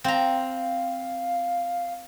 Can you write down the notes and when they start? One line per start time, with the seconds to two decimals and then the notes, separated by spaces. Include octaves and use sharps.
0.04 C4 F5 A#5